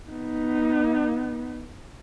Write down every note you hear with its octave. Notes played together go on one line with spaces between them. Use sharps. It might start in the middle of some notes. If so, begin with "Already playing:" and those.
B3 D#4